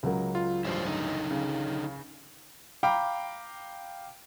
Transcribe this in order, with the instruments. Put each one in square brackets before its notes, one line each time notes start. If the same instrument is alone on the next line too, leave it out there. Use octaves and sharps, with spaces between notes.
[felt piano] C#2 F#3 A#4
[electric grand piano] F4
[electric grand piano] A1 G2 [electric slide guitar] E4 F4 C5
[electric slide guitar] D3 D#4
[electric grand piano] C#3 F5
[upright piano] F5 G5 A#5 B5 D6